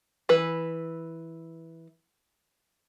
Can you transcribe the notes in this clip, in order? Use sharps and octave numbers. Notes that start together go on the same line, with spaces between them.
E3 B4